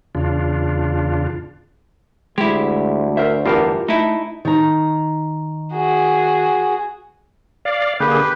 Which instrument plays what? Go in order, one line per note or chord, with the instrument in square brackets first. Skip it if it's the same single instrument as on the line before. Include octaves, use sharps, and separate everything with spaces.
[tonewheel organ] E2 C#3 D4 F4
[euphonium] D2 [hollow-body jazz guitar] G#3 [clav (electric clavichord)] E4 G4
[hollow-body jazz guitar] A#4 C5 E5
[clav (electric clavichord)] E2 G2 [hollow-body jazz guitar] F4 G4 A#4
[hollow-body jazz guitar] A3 [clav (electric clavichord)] D#4 E4
[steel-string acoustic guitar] D#3 A#5
[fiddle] F#4 G#4
[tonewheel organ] D5 F5
[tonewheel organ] D3 A#3 G#4 [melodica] G4 B4